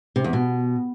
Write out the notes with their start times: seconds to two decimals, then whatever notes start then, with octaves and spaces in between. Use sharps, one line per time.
0.16 C3
0.24 E2
0.33 B2